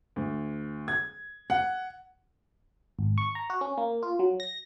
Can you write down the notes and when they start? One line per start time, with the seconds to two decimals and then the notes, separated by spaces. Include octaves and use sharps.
0.16 D2
0.88 G#6
1.50 F#5
2.99 G#1
3.18 C#6
3.35 A#5
3.50 F#4
3.61 C#4
3.78 A#3
4.03 F4
4.19 F#3
4.40 A#6